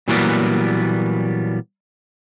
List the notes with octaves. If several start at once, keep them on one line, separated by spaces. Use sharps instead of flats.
A#2 E3 F#3 G3 A#3 B3